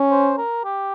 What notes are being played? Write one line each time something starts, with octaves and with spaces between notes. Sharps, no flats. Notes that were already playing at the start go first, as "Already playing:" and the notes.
Already playing: C#4
C5
A#4
G4